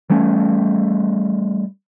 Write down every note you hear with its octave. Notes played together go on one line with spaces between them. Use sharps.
E3 G3 A3 C#4